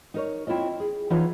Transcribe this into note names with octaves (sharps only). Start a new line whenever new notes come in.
D#4 A#4 C#5
C4 E4 F4 C#5 D#5
G#4
E3 B3 D#4 F4 C#5